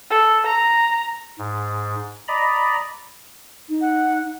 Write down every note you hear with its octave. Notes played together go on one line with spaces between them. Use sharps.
A4
A#5
G#2
D5 D#5 A#5 B5
D#4
F#5